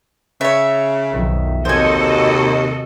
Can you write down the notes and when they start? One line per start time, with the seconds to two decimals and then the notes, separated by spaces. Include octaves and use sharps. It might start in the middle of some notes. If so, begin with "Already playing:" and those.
0.41 C#3 C#5 E5
1.13 B1 F2 D#3
1.65 D#2 C3 F#4 A4 C5 D#5 G#5